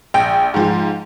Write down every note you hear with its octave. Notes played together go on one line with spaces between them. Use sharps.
A#1 G5
G#2 F3 G#3